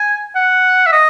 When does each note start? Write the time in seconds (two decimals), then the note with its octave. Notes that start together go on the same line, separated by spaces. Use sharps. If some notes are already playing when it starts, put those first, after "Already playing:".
Already playing: G#5
0.35 F#5
0.87 E5
0.93 D#5